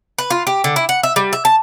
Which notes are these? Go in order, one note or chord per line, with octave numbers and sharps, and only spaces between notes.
B4
F4
G4
D3
E4
F#5
E5
G3
E5
A5